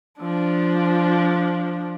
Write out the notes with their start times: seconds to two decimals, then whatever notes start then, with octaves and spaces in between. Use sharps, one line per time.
0.20 F3 D4